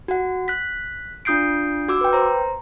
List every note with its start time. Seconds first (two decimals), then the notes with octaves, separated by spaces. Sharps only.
0.08 F#4 F#5
0.48 F#6 B6
1.25 D4 F4 D#6 G6 C7 D7
1.88 F#4 D6 E6
2.01 B4 G5
2.13 C5 A#5